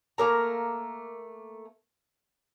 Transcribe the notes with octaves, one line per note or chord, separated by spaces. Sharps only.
A3 A#3 A#4 A#5